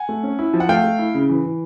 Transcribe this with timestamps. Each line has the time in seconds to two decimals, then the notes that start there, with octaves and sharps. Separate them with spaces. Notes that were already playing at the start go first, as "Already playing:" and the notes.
Already playing: F#5 G#5
0.09 A3
0.23 C#4
0.39 E4
0.54 F3
0.60 F#5
0.69 A3 F5 G5
0.84 A3
0.99 E4
1.14 C#3
1.29 E3
1.44 E3